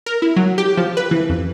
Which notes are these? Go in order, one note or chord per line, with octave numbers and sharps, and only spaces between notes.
A#4
E4
F#3
G4
F3
B4
E3
F2